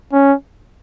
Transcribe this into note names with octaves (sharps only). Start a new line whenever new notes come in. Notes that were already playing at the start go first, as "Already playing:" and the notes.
C#4